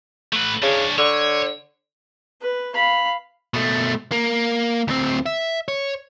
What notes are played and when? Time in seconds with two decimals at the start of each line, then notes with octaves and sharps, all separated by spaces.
0.33 A3 B4
0.63 C#3 D4 C#5
0.98 D3 C#5
2.41 B4
2.75 F5 B5
3.54 B2 A3
4.12 A#3
4.88 D2 C4
5.26 E5
5.68 C#5